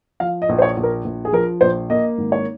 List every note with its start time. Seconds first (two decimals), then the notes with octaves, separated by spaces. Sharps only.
0.20 F3 F5
0.42 D#5
0.49 A#1
0.58 C5
0.62 C#5
0.77 A#1
0.83 A#4
1.04 A#1
1.25 G#4
1.32 F3 A#4
1.61 A#1 C5
1.90 A#3 D#5
2.18 G#1
2.32 C#5